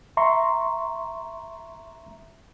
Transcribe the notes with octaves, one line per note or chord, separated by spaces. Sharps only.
E5 A#5 C6 C#6